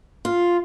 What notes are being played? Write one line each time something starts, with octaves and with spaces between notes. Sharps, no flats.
F4